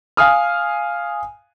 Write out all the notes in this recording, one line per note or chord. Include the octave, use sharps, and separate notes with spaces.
F5 G#5 D#6 F6